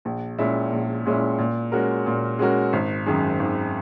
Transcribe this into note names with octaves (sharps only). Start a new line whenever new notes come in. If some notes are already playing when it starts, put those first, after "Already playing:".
A#1
A#2 G#3 C#4 E4
A#1
A#2 G#3 C#4 E4
A#2
G#3 C#4 F#4 A#4
A#2
G#3 C#4 F#4 A#4
G#1
F#2 D#3 G#3
G#1